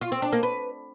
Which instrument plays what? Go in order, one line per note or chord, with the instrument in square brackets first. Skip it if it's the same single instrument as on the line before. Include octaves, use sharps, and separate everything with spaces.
[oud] F4
C4
D4
A#3
B4